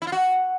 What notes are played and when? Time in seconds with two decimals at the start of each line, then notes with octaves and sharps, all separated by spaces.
0.02 E4
0.07 F4
0.12 F#4